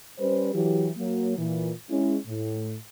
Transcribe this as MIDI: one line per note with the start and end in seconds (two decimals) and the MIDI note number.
0.19 0.52 55
0.19 0.52 61
0.19 0.52 71
0.19 0.52 72
0.54 0.89 52
0.54 0.89 54
0.54 0.89 67
0.97 1.35 54
0.97 1.35 58
1.38 1.72 46
1.38 1.72 52
1.90 2.17 56
1.90 2.17 61
1.90 2.17 64
2.27 2.76 45